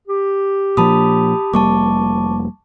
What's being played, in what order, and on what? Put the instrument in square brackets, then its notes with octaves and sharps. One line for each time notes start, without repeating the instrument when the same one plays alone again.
[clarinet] G4
[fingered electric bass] A#2 F3 A#3 [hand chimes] A5 B5 D#6
[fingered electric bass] F1 G3 A#3 [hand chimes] A5 C#6 D6